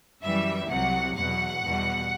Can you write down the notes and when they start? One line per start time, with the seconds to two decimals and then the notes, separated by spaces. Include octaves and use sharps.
0.23 F#2 E3 G3 E5
0.70 C2 C3 F#3 F#5
1.16 E2 B2 F#3 F#5
1.63 E2 B2 G3